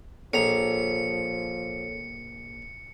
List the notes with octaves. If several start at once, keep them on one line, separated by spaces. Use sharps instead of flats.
A#1 F3 A4 C#5 A#5 C#7